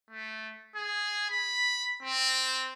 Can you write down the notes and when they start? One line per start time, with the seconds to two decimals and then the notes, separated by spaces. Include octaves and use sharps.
0.10 A3
0.75 G#4
1.30 B5
2.03 C4